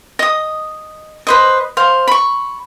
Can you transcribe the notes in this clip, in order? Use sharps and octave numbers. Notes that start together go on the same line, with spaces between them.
D#5 D#6
B4 C5 D#5
C5 F5
B5 C#6